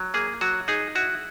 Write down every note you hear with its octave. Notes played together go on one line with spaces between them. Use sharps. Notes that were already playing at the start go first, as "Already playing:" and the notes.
Already playing: F#3
A#3 G#4
F#3 F#4
D#4 G#4
E4 F#4